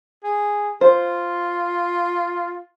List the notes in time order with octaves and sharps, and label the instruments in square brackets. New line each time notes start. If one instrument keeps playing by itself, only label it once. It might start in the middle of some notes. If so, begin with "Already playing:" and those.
[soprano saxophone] G#4
[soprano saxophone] F4 [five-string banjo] C5